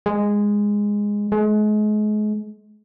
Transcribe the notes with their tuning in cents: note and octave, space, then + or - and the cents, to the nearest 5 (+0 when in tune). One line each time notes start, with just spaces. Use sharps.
G#3 -10
G#3 +35